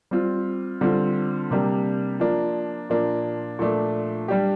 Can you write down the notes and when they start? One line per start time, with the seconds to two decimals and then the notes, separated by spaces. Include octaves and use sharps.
0.11 G3 C4 F4
0.81 D3 G3 C4 F4
1.51 C3 G3 A#3 D4 G4
2.20 F3 A#3 D4
2.90 A#2 F3 A#3 D4
3.59 A#2 F3 A3 D4
4.28 G3 D4 G4